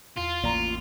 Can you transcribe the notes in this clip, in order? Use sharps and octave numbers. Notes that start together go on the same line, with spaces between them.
E2 F4
A1 A#3 D5 A#5